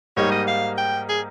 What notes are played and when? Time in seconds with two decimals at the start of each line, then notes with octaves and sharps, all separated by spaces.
0.17 G#2 G3 A#3 D#4 C#5
0.32 D#5
0.47 F5
0.78 G5
1.09 G#4